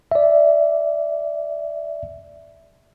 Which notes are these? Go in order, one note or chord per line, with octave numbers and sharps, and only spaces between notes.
D5 E5